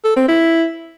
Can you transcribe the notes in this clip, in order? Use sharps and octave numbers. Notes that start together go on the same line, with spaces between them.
A4
C4
E4